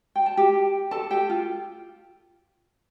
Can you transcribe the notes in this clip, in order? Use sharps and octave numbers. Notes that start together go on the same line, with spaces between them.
G5
A5
G4 G5
A4 A5
G4 G5
F4